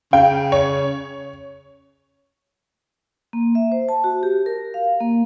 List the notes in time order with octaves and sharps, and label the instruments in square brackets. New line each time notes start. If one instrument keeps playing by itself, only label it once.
[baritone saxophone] C#3 [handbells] F5 [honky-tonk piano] G5
[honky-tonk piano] C#5
[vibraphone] A#3
E5
C5
A5
F#4
G4
A#4
F5
A#3